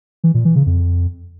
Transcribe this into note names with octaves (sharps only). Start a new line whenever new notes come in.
E3
A#2
E3
C#3
F2